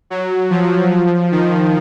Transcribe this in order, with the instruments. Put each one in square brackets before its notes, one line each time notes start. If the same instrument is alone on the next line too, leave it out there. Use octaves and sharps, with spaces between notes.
[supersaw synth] F#3
F3
D#3